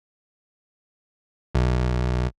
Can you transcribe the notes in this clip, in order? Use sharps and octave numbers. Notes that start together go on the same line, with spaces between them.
B1